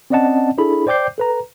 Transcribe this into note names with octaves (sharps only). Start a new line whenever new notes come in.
C4 C#4 D5 D#5 F#5 A5
D4 E4 G#4 A4 B5
C5 D5 G5 D6 G6 C7
A4 B4 A#5